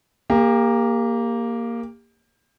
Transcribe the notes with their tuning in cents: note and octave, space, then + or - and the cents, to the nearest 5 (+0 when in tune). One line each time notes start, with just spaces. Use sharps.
A#3 +0 G4 +35